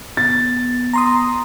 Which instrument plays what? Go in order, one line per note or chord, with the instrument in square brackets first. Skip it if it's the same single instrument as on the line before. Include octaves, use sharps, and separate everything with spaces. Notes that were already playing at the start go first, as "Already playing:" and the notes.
[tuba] B3 [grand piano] A6
[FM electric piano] A#5 C6 D#6